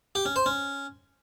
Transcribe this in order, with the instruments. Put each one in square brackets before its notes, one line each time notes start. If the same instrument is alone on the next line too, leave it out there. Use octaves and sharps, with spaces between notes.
[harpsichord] G4
C#4
C5
C#4